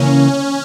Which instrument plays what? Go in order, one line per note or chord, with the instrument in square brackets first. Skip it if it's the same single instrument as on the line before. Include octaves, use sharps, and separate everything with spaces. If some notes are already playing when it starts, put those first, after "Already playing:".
Already playing: [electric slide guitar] C#3 E3 A#3 [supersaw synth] C#4